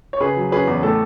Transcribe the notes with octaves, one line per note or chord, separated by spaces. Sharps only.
C#5
C#3 G#4 B4
F#3
C#4 G#4 B4
E2
A2 A4